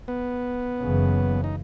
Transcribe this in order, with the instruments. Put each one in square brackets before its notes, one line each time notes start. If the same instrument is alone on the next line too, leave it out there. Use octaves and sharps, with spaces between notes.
[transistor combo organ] B3
[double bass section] F#1 F#2 C#3 E3
[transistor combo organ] D#4